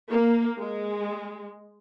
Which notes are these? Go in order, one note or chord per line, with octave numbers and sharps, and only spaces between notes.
A#3
G#3